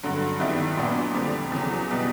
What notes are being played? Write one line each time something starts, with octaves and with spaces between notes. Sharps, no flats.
G2 D3 F#3
G2 D#3 G3 B3 E4
A#2 F#3 B3 D4
F2 D3 G3 C4
E2 C#3 F#3
B2 G3 B3 D#4